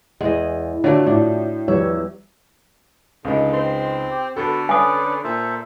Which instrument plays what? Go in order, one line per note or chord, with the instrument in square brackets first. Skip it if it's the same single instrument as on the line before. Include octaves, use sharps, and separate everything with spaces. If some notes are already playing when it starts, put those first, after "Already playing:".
[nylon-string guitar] E2 [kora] G#3 D#5
[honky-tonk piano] D3 [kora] F#3 A3 [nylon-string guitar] F4 D5
[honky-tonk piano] A2 [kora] D4
[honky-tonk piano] E2 [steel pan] F3 G3 C#5 [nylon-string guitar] E5
[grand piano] C#2 D#4 [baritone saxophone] D3
[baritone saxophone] C4 [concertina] C6
[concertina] G4
[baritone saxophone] D3 [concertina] B3 F#4 B4 [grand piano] A4
[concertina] C#4 B4 D5 [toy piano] G#5 D#6
[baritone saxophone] A#2 [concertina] A4 C5 E5